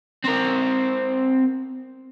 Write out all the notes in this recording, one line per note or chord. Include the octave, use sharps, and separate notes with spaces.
C4 A#4